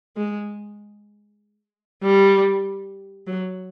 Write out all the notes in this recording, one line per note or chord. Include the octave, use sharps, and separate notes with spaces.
G#3
G3
F#3